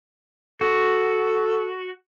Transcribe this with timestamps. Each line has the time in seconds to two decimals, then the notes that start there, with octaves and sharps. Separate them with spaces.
0.61 F#4 A4